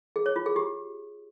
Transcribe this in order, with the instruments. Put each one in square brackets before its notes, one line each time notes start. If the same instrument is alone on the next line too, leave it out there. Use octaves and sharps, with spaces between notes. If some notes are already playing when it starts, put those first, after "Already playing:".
[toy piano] G#4
C#5
F4
G#4
G4